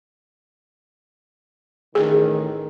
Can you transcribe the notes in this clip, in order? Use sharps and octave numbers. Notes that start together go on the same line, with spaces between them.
A1 D#3 G#4